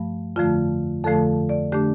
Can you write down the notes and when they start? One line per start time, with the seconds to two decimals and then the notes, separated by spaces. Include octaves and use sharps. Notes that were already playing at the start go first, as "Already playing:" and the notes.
Already playing: G2 F3 A3
0.36 F2 D3 F3 A3 F4
1.04 F2 D3 F3 A3 A4
1.49 D5
1.72 D3 A3 D4 G4